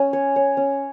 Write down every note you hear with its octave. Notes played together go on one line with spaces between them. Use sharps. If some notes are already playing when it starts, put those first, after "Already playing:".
Already playing: C#4
C#5
C#5
C#4